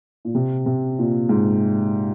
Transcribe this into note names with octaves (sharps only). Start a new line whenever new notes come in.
A#2
C3
C3
A#2
G#2